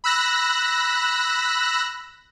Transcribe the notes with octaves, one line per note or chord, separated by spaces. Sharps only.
B5 E6 F#6 A#6